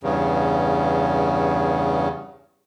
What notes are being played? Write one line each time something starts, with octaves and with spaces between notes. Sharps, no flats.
E2 G2 C#3